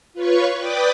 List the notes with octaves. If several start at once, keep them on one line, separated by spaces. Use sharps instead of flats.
F4 B4 C#5 C#6
B4 D5 G5 D6 D#6